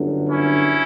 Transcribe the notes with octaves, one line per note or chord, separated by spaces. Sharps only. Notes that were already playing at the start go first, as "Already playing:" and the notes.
Already playing: G1 F#2 D3
C#4 E4